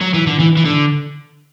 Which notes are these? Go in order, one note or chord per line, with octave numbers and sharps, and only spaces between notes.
F#3
E3
D3
E3
E3
D3